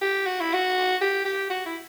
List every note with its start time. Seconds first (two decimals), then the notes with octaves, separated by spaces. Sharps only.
0.01 G4
0.26 F#4
0.41 E4
0.53 F#4
1.01 G4
1.25 G4
1.50 F#4
1.66 E4